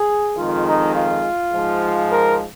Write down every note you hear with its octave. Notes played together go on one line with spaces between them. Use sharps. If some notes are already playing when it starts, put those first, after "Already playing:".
Already playing: G#4
F2 D#3 G#3 F4
D#4
F4
G#2 F3 G#3
A#4